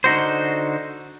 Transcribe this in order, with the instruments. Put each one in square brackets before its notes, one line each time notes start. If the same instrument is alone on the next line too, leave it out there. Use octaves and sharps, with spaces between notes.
[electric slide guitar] D3 D#4 F#4 C5